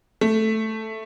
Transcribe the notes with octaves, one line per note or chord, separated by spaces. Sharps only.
A3